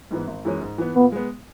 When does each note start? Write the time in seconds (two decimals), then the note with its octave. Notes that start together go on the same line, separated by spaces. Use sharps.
0.11 G#2 E3 B3
0.27 G#1
0.45 F#2 E3 G#3 C#4
0.61 G#2
0.78 E3 B3
0.95 A#2 B3
1.12 G#3 B3